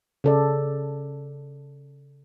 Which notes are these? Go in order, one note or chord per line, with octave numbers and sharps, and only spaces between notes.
C#3 A4 D5